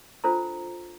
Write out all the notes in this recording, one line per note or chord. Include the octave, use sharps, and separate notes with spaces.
D4 F4 A4 C5 A#5